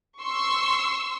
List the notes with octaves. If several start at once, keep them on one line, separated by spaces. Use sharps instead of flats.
C6 C#6 E6